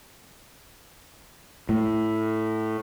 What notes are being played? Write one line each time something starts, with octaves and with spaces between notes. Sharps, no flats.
A2